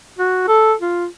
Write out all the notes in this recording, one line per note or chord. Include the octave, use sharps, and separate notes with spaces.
F#4
A4
F4